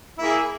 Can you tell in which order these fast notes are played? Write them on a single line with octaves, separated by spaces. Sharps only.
E4 A#3 G#4